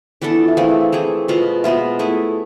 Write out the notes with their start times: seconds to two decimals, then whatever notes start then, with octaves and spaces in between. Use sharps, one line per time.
0.21 E3 B3 D4 A4
0.30 E4
0.40 F4
0.48 E5
0.57 E3 A3 C4 G#4 F5
0.69 E5
0.81 F5
0.92 E3 A3 C4 G#4
1.28 B2 G#3 B3 F4
1.64 B2 G#3 B3 F4 E5
1.99 A3 E4 G#4